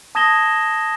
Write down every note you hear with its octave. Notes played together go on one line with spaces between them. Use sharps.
A5 D#6 G#6 A#6 E7 G7